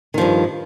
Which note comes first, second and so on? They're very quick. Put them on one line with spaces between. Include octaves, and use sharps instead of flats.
D#3 F3 G2